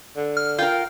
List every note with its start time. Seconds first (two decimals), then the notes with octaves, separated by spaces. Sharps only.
0.16 D3
0.37 F6
0.58 F4 A#4 G5